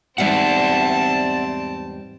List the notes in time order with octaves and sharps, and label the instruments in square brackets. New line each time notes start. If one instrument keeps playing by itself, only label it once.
[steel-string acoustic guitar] E2 G#2 G3 [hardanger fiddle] C4 A5 [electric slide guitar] D5 E5 F#5